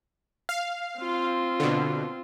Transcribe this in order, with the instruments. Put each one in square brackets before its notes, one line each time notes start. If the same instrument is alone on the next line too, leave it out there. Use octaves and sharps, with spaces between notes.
[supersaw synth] F5
[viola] C4 F4
[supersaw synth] B2 D3